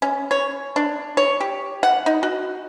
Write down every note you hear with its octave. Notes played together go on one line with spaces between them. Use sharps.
C#4
C#5
D4
C#5
G4
F#5
D#4
F#4